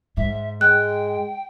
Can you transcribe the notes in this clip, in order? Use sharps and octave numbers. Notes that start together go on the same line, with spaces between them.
G#2 E5
G#3 G5 F#6